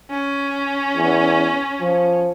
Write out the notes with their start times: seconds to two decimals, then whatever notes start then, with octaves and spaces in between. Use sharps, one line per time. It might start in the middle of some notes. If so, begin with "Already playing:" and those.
0.10 C#4
0.96 E2
1.80 F3